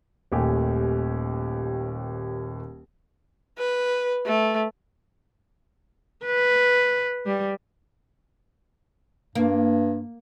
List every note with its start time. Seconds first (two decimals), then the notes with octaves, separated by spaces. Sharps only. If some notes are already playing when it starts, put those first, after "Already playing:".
0.32 D#1 D#2 A3 G4 G#5
3.58 B4
4.25 A3
6.25 B4
7.26 G3
9.35 G2 A#3